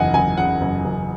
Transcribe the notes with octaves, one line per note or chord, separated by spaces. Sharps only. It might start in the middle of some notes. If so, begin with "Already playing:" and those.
Already playing: F#1 E2 D#5 F#5 G#5
F#1 G#5
C#3 F#5
F#1
F#1